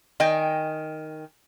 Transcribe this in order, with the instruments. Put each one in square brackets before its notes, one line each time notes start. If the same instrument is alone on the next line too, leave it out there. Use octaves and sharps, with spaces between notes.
[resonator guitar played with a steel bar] D#3 D#5 G5 G#5